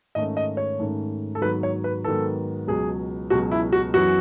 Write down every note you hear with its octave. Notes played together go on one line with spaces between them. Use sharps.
G#2 D#3 A3 C#4 D#5
D#5
C#5
G#2 D#3 A3 C#4
A4
G#2 D#3 F#3 B3 B4
C#5
B4
G#2 D#3 F#3 B3 A4
C#2 B2 F#3 G#4
C#2 B2 F#3 F#4
E4
F#4
F#2 E3 B3 F#4